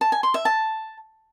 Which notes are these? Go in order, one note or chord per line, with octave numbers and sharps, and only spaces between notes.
A5
G#5
C6
E5
A5